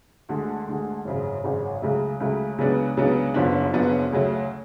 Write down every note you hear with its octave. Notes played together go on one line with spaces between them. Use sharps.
D2 D3 G#3
D2 D3 G#3
G#1 F#2 C#3
G#1 F#2 C#3
C#2 C#3 F#3 A3
C#2 C#3 F#3 A3
C#2 C#3 F#3 B3 D4
C#2 C#3 F#3 B3 D4
F#1 F#2 F3 B3 D4
F#1 F#2 F3 B3 D4
D2 C#3 F#3 A3